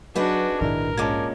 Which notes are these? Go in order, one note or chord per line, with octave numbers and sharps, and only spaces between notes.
F#3 D4 D#4 F#4 G#4 B4
A#1 G#2 D#3 D4 E4 A#4
A#2 G#3 C#4 A5 D6 G#6